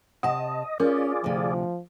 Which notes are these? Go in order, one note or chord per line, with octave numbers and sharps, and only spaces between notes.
C3 D#5 F#5 A5
C#4 F4 G#4 A#4 D5
D2 C3 F3